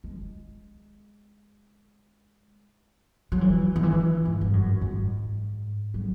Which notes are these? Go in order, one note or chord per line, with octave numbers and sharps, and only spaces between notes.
G#3
F#3
E3
D#3
E3
G#2
G#2
F#2
G#2
F#3